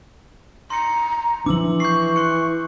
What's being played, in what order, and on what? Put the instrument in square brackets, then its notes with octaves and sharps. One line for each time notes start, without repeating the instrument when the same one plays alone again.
[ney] A#5 [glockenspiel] C6 C#7
[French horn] E3 [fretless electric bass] F3 D4 [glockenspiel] D6 E6 F#7
[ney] C#6 [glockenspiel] G6 C7
[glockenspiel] C6 F#6 C#7